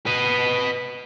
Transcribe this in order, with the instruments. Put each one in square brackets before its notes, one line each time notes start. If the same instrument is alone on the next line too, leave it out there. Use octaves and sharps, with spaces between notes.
[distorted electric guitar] B4 D#5